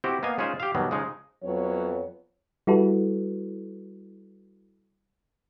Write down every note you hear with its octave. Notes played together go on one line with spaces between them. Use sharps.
C4 E4 F#4 G4
A#3 B3 D#5 F5 G#5
G#3 C#4 D#4 F4 G#4 C5
G4 F5
B2 D#3 F#3 G3
C#3 F3 G#3 D#4
F2 F#3 B3 C#5
G3 E4 F#4 A4 B4